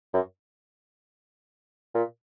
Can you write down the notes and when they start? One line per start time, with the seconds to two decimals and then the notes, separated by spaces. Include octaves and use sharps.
0.14 F#2
1.95 A#2